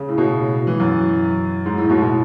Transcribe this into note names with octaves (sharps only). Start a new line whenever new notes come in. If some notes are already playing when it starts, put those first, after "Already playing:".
Already playing: C#3
A2
B2
E3
F#2
G#2
A2
B2
B2